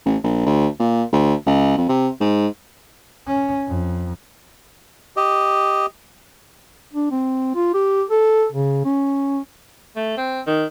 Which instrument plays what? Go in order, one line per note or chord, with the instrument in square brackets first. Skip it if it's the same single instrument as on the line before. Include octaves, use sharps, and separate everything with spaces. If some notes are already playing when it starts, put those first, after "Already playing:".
[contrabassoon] A1
A#1
D2
A#2
D2
C#2
F2
C3
G#2
[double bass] C#4
F2
[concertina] G4 D#5
[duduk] D4
C4
F4
G4
A4
C#3
C#4
[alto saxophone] A3
C4
D#3